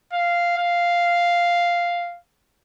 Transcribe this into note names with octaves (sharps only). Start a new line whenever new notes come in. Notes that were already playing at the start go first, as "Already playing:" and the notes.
F5
F5